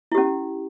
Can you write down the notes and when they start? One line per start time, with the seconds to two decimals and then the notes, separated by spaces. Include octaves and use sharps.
0.12 E4
0.15 G4
0.18 C#4